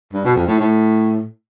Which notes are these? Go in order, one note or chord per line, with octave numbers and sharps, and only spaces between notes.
G2
B2
F2
A2
A2